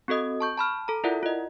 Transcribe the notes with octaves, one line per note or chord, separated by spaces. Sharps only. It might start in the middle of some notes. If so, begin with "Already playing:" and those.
C4 F#4 A4 D#5 D#6
A5 C#6 G6
A5 B5 F6
A4 A#5
E4 F4 A#4 D5 E5 F#5
F4 D#5